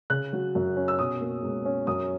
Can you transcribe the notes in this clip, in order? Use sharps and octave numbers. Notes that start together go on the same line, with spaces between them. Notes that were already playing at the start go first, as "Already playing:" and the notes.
C#3 F#6
F#3
F#2
C#4
E6
B2 D#6
A#3
C#2
C#4
F#2 D#6